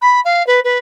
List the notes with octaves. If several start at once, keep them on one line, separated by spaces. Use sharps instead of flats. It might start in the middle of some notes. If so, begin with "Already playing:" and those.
B5
F5
B4
B4